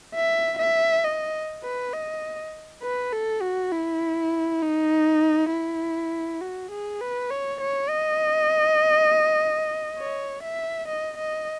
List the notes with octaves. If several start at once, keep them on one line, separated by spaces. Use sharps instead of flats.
E5
E5
D#5
B4
D#5
B4
A4
F#4
E4
D#4
E4
F#4
G#4
B4
C#5
C#5
D#5
C#5
E5
D#5
D#5